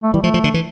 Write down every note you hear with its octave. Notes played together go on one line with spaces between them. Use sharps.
A3
E3 G3
F3 A3
F3
D3
E3